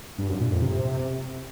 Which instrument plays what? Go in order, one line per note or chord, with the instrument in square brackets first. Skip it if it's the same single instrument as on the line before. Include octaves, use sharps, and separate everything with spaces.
[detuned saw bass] G2
F#2
A#2
F2
C3